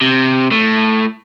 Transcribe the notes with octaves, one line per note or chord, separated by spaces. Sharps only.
C3
A2